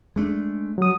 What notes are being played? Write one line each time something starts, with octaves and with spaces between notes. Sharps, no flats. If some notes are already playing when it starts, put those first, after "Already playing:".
G#3 A3 D4
F#3 D#6